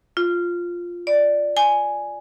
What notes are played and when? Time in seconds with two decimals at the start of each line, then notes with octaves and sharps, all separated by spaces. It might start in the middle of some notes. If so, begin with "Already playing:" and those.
0.17 F4
1.07 D5
1.57 G#5